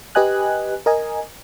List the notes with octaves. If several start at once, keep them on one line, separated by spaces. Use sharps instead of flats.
G4 B4 D#5 G#5 F#6
A#4 D#5 G#5